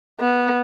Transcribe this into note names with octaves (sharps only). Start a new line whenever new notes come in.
B3